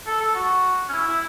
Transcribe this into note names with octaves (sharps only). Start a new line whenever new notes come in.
A4
A4
F#4
C#4
E4
E4